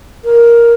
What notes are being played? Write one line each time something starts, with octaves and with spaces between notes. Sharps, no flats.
A#4